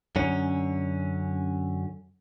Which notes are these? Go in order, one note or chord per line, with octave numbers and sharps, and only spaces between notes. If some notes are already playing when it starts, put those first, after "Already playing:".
F#2 D3 C#4